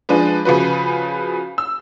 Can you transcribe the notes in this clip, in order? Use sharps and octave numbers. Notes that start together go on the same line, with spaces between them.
F3 G#3 D4 B4
C#3 F3 F#4 B4
E6